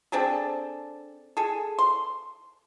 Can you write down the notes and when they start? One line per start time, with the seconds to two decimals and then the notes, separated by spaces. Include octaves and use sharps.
0.12 C4 D4 G#4 A4
1.37 G#4 A4
1.79 C6